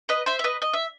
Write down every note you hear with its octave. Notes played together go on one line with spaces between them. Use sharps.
B4 D#5
C5 E5
E5
B4 D#5
D#5
E5